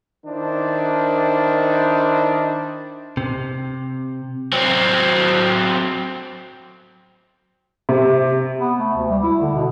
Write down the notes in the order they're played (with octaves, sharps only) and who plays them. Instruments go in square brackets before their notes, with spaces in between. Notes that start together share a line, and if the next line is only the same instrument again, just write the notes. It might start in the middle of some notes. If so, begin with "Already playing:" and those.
[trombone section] D#3 D4 E4 C5
[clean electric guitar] C3
[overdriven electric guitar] F#3 C4
[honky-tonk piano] C3
[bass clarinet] B3
A3
D2
G3
E4
D3
B2